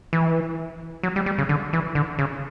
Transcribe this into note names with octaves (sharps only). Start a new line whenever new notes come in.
E3
F#3
G3
G3
C#3
D3
E3
D3
C#3